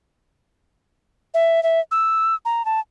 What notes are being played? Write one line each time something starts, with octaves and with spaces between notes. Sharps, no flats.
E5
E5
E6
A#5
A5